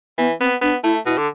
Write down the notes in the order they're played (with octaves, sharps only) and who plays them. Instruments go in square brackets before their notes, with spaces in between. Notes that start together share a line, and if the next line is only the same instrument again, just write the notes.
[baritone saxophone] E3 [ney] B3
[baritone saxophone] B3 [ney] C4
[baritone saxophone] B3 [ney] D4
[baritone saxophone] A3 [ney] E4
[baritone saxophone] B2 [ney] E4
[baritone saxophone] D3